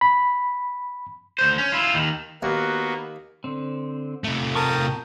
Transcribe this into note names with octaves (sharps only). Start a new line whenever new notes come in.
B5
D2 C5
C#4
E4 F4
D#2 D#3
D#2 A#3 B3 F#4
D3 C4
C3 A3
A#4 G5 A5 C#6 D#6